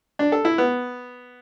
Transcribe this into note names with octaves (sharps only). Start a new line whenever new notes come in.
D4
A4
E4
B3